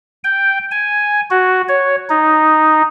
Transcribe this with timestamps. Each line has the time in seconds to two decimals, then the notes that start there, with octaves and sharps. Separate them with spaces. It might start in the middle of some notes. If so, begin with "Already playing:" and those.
0.24 G5
0.71 G#5
1.30 F#4
1.68 C#5
2.10 D#4